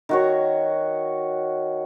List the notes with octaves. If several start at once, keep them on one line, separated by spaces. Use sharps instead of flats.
D#3 F#4 C#5